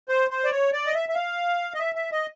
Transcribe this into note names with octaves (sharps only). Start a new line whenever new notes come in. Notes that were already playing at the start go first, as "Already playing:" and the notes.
C5
C5
D5
C#5
D5
D#5
E5
E5
F5
D#5
E5
E5
D#5